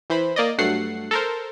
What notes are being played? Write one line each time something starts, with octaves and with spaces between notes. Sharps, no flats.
E3 C5 B5
A#3 D5 D#5
G2 F#3 A3 F#5 C7
A4 A#4 C5